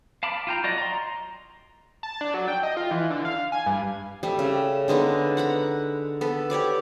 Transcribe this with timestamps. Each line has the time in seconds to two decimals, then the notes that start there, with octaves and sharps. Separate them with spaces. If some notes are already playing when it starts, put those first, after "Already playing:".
0.23 F5 A5 B5 D6
0.47 F4 G5 A#5
0.63 F#3 F#4 D5 D#5
0.78 A#5 C6
2.03 A5
2.21 D4
2.34 F#3
2.48 G5
2.63 D#5
2.77 F4
2.91 E3
3.10 D3
3.25 F5
3.52 G#5
3.66 G2
4.23 G3 A3
4.39 C#3
4.88 D3 G#3 B3 D#4
5.37 F#5 A#5 B5
6.21 B3 A4
6.50 G4 C#5 D5 D6